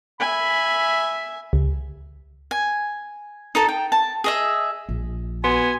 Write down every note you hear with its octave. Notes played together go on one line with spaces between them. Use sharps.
E5 G#5 B5
C#2
G#5
D#4 A4 A5
G5
A5
G#4 D#5 E5
A#1
B3 F#4 G#5